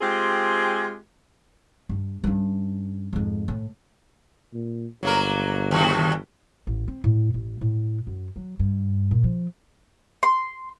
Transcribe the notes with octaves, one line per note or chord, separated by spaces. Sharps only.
G#3 C4 F4 G4 G#4
G2
G2 C#4
F2 G#2
A2
A#2
G1 F#3 A#3 A#4
D#2 B2 F#4
A1
C4
A2
A1
A2
F#2
F#3
G2
A#2
F3
C6